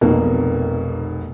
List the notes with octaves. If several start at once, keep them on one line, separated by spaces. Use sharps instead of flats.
F1 B1 B2 A#3